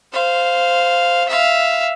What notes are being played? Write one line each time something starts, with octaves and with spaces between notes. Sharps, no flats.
C5 F5
E5 F5